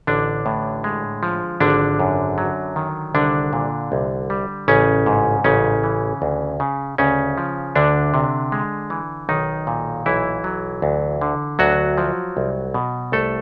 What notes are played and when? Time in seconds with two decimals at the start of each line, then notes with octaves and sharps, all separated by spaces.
0.07 A1 D3 D4
0.46 A2
0.84 G#3
1.23 F3
1.60 G#1 D3 D4
1.99 F#2
2.38 F#3
2.76 D#3
3.14 C2 D3 D4
3.53 A#2
3.92 C2
4.30 G3
4.68 A1 C#3 C#4
5.06 G#2
5.44 A1 C#3 C#4
5.84 E3
6.22 D2
6.60 C#3
6.98 D2 C#3 C#4
7.38 F3
7.76 D2 D3 D4
8.14 C3
8.52 G#3
8.90 E3
9.29 B1 D#3 D#4
9.67 A#2
10.06 B1 E3 E4
10.44 F#3
10.82 D2
11.21 D3
11.59 D2 F#3 F#4
11.98 F3
12.37 C2
12.74 B2
13.12 C2 A3 A4